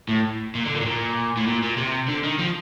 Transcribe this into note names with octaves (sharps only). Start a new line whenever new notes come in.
A2
A#2
D3
A#2
A2
A#2
A2
A#2
A#2
C3
D3
D#3
F3